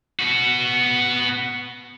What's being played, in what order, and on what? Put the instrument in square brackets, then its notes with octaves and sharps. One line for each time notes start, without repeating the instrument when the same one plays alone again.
[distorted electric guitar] B3 F#4